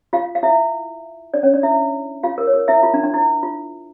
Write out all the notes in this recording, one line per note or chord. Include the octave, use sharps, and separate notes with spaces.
F4 F5
F5
E4 E5
D4 D5
C#4 C#5
D4 D5
E4 E5
F4 F5
A#4
C#5
A#4
E4 E5
F4
D4
D4
E4
F4